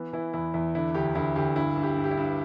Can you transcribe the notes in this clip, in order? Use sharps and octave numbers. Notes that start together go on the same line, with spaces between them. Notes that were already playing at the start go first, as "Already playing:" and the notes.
Already playing: E3 B3
E3 E4
E2 E4
E2 E4
D3 E4
D2 G4
D2 E4
D2 G4
G2 E4
G2
G4
G2
G4
E4
G2